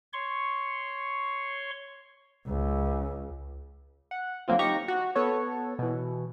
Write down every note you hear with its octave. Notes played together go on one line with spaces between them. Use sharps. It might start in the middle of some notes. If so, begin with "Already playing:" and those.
C#5 C6 C#6
C#2
F#5
D3 F#3 A#3 C4 F4
D#4 G4 A#5 C#6
F#4
B3 A4 C#5
B2 E3